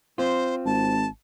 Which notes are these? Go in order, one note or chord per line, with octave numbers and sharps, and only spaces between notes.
C4 F4 C5
G#1 A5